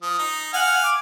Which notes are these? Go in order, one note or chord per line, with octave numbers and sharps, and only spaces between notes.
F3 D#6
D#4
F5 F#5 G#5 F6
D6